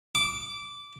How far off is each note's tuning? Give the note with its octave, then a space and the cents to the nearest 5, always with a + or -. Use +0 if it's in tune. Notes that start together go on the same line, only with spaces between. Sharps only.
D6 -15